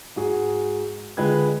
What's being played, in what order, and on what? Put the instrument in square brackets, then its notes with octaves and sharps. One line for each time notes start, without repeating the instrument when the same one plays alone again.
[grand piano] G#2 F#4 G#4
D3 G#3 F4 B4 G5 G#6